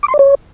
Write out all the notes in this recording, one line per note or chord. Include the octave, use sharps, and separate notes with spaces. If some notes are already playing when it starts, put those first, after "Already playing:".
D6
C6
D5
C#5